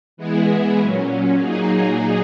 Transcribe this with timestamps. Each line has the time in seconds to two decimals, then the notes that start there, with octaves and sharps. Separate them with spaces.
0.17 E3 G#3 B3 E4 G#4
0.79 A#2 F#3 C#4
1.39 A#2 F#3 A#3 D#4 G#4